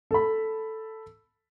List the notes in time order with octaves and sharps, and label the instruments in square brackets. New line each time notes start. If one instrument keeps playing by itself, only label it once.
[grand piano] A4 B5